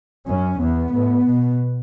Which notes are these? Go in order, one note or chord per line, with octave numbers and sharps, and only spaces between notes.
F#2 C#4
E2 B3
A2
B2